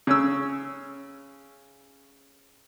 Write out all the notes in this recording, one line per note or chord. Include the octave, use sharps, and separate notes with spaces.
C#3 C#4 E6